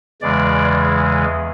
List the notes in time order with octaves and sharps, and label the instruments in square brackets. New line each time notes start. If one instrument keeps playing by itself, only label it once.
[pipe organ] E2 C#3 E3 G#3 D5